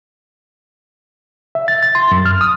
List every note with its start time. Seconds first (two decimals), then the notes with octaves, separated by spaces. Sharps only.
1.55 E5
1.68 A6
1.83 A6
1.95 C6
2.11 F#2
2.26 F6
2.41 D#6